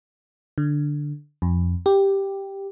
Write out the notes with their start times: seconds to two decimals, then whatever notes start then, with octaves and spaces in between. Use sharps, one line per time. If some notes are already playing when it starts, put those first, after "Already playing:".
0.58 D3
1.42 F2
1.86 G4